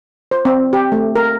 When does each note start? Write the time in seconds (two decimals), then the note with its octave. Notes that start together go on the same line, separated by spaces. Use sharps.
0.31 C5
0.45 C4
0.73 G4
0.92 A3
1.16 A#4